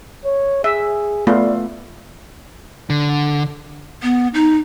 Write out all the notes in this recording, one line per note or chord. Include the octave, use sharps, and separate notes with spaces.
C#5
G#4 E5
A3 B3 F4 D5
D3
B3
D#4